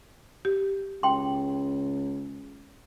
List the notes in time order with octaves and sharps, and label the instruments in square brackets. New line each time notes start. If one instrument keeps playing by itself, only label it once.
[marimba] G4
[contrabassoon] C#2 [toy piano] G5 C6